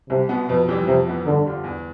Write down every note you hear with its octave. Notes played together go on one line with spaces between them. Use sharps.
C2 C3
B2 B3
F2 B2
C3 E3 G3
F2 C3
E3 B3
G2 D3
D3 G3 D4 F4
E2